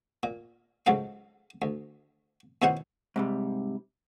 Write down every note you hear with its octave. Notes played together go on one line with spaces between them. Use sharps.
A#2
C#2 G#2 F#3 A4 F5
D2
D#2 B2 C#4 E4 C5 F#5
G#2 C3 G3